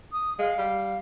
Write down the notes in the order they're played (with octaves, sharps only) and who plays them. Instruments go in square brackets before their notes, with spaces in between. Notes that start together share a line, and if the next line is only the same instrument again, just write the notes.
[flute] D#6
[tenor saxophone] G#3 [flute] F5
[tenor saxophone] G3